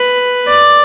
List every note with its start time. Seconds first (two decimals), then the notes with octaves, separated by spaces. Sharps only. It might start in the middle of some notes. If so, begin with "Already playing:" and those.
Already playing: B4
0.47 D5